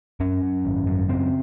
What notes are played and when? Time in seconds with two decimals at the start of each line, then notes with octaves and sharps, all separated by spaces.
0.20 F#2 C#4
0.42 F#2
0.65 G#1
0.87 F#2
1.09 C#3 C4